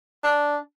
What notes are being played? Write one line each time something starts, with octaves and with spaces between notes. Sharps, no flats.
D4